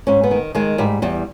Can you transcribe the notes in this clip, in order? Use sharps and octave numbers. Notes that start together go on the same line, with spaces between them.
G#2 C#4
B3
D#3
D#3 G#3
G#2 G3
E2 G3